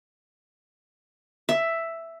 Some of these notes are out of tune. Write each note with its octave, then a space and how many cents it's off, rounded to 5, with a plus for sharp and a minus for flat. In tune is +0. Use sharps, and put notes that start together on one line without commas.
E5 +5